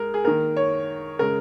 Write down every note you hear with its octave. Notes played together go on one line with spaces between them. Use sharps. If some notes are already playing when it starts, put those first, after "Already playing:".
Already playing: G#3 A#4
G#4
D#3 A#3 A#4
C#5
C#3 G#3 A#4